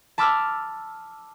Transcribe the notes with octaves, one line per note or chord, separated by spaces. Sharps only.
A5 B5 D6 E6 F6